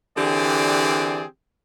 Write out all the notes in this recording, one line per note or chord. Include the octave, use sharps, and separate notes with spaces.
D3 E3 C4 G4 G#4 D5